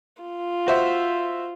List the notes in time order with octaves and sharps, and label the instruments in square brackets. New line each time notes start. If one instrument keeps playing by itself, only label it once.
[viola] F4
[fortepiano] F#4 C5 E5